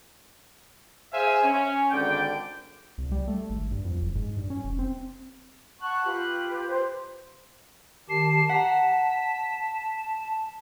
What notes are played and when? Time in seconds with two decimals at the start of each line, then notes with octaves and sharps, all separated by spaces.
1.12 G#4 C5 E5 F5 G#5
1.43 C#4
1.91 G#1 D3 D5 G5
2.98 C2
3.12 G3
3.28 A3
3.50 G#1
3.71 G2
3.85 F2
4.02 F#1
4.15 G#2
4.37 G2
4.50 C#4
4.64 F1
4.79 C4
5.81 F#5 A5 C#6 F#6
6.05 F4 G4 B4
6.68 C5
8.10 D#3 G4 A5 C7
8.49 F#5 A5 A#5 B6